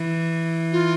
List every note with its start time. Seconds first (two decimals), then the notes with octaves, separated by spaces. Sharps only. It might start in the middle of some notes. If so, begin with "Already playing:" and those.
Already playing: E3
0.72 F4